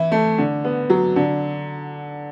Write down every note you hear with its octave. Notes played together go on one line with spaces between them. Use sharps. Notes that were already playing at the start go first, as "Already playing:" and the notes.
Already playing: E3 E4
A3
D3
B3
F#3
D3